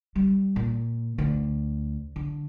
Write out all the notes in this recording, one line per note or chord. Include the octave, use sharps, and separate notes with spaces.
G3
A#2
D2
D3